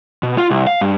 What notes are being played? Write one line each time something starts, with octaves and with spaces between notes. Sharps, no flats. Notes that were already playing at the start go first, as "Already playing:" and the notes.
B2
F4
C2
F5
G2